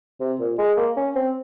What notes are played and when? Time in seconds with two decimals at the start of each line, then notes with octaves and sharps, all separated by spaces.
0.20 C3
0.39 A#2
0.58 G#3
0.77 A#3
0.96 C#4
1.15 C4